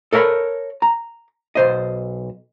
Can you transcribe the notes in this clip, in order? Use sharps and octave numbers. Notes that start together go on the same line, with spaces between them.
A4 A#4 C#5 F#5 B5
A#5
B1 C5 D#5